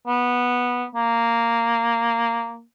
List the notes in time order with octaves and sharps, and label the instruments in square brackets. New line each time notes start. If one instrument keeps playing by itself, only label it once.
[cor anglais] B3
A#3